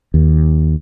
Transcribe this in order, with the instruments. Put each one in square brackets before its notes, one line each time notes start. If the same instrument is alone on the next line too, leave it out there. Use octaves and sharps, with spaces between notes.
[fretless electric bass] D#2